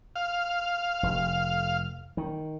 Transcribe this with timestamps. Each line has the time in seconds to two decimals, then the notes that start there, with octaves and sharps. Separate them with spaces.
0.16 F5
1.03 F1
2.17 D#3